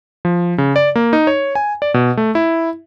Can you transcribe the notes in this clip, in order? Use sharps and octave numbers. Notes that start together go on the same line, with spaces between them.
F3
C#3
D5
A#3
D#4
C#5
G#5
D5
B2
A3
E4